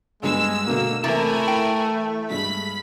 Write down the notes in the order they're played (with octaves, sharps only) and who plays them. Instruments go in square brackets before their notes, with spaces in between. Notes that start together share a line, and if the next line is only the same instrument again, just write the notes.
[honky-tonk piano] D2 G2 B3 [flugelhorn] G#3 [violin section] E6
[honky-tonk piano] B2 D3 A3 [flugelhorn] A#3
[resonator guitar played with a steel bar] C3 A#3 [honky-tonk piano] E3 [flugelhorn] A3 [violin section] E4 A#4 G#5
[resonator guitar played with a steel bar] G5
[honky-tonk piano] G2 G#3 [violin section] B5 B6